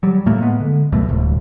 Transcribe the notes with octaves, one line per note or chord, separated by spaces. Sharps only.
F#3 G3
A2 A3 A#3
G#3 B3
D3
C#2 F#2 B2 A3
D1 C2